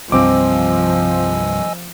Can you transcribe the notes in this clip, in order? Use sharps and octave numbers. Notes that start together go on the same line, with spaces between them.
C2 G2 F3 C4 D#5 G#5 D6 E6